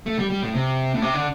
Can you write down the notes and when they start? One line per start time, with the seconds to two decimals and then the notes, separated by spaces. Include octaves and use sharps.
0.06 A3
0.19 G3
0.30 G3
0.42 A2
0.54 C3
0.94 A2
1.02 C3
1.14 D3